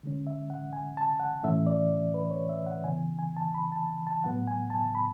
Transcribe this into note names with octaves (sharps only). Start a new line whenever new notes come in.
D3 G#3 C#4
E5
F#5
G#5
A5
F#5
A2 E3 A3 C#4 E5
D5
B4
C#5
E5
F#5
C#3 E3 B3 G#5
G#5
A5
B5
A5
A5
A2 F#3 B3 F#5
G#5
A5
B5